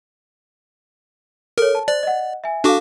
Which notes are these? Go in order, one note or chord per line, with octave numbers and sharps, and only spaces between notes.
A4 A#4 C#5
A5
C5 D5
D#5 F#5
E5 G#5
D4 F#4 A4 F5 D6